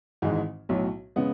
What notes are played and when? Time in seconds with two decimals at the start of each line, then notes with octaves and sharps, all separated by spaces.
0.22 G#1 G#2 E3 G#3
0.69 B1 A2 F#3
1.16 C#3 G#3 B3